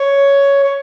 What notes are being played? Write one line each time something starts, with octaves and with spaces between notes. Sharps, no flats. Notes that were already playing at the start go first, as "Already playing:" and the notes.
Already playing: C#5
C#5